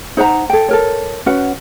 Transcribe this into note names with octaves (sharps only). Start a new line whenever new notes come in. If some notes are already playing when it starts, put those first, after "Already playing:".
D#4 C5 F#5 A#5
A4 G5
A4 A#4 C#5
C#4 F#4 B4 F#5